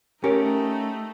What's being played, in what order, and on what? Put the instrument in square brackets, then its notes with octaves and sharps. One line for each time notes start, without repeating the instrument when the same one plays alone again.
[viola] A3 D#4 [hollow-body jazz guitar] C#4 G4 A#4